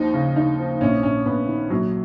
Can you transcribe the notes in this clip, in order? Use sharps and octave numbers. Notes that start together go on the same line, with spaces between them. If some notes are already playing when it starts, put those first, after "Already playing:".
Already playing: D#2 F3 D#4
C#3
C#3 D#4
F3
A#1 C#4
A#1 C#4
A#1 B3
D#3
A#1 F#3